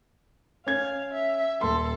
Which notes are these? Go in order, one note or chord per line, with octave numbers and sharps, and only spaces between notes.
C#4 F5 G#6
E5
D#1 A4 C6